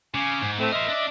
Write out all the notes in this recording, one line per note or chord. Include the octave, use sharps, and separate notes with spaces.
C#3 G#5 D6
G#2
A2 A3 C4
A#4 C5 D#5 E5
D4 D5